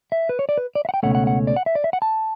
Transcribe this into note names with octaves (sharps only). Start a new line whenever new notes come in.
E5
B4
C#5
D5
B4
D5
E5
F#5
G5
C#2 B2 A3 C#4 F#5
F#5
F#5
D5
F#5
E5
D5
E5
F#5
A5